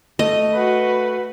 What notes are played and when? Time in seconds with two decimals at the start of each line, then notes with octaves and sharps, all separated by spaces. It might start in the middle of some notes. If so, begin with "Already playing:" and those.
0.19 A3 D#5
0.53 F#4 B4